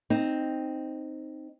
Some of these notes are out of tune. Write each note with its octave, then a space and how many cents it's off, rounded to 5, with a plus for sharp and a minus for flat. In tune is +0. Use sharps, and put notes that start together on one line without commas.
C4 +0 D#4 -5